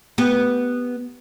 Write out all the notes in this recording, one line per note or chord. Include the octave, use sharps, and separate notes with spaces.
B3 G4